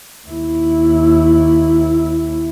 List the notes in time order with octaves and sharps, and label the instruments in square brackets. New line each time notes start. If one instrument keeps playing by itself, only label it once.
[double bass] D#2 E4